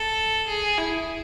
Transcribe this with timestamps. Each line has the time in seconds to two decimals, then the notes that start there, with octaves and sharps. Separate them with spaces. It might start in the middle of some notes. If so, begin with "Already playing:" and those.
Already playing: A4
0.47 G#4
0.78 E4